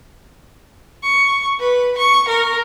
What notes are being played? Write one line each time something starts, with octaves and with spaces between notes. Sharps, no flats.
C#6
B4
C#6
A#4